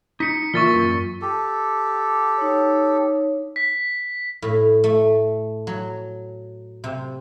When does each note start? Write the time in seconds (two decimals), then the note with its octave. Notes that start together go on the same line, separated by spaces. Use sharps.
0.20 D#4 B6 C#7
0.54 A#2 E3 F4 E5 C#6 A6 G7
0.75 F#2
1.22 G4 A4
2.38 D#4 C#5
3.56 B6
4.42 A2
4.84 A3
5.67 F#3
6.84 C3